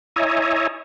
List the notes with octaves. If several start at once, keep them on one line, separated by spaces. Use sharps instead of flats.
E4 C#5 D#5 E5 G#5 A#5